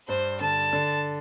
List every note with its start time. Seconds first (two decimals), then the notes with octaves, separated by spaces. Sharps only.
0.08 G2 G3 C5
0.41 D3 A5
0.73 D3